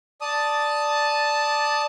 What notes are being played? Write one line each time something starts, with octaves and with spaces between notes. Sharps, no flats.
D5 A5 D#6